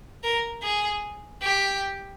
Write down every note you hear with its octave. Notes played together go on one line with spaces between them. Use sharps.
A#4
G#4
G4